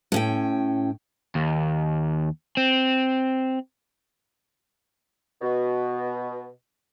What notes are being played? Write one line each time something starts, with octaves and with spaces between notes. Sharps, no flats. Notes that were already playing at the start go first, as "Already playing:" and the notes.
A2 C#4 G5
D#2
C4
B2